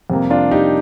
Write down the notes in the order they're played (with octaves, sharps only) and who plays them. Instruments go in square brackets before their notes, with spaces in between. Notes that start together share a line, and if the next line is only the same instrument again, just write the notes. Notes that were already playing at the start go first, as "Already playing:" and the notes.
[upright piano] F2 C3 G3 A#3
D4 F4
D#4 G4